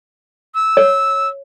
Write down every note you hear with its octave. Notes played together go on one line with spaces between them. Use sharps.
E6
C#5